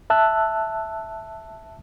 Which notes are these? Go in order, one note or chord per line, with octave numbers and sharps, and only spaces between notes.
E5 A5 E6 F#6